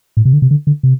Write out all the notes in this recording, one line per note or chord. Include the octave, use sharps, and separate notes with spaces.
A2
C3
D3
C3
D3
D3
C3